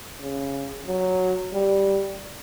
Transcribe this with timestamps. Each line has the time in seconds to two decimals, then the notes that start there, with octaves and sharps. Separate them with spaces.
0.21 C#3
0.87 F#3
1.54 G3